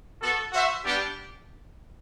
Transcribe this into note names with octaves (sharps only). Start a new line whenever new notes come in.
B3 F#4 A4
F#4 C5 E5
G3 B3 D4 G4